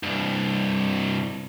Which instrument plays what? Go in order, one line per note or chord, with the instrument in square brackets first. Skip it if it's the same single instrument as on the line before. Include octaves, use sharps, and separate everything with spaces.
[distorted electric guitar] C2 G2